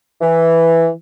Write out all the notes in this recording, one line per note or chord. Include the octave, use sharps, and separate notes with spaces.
E3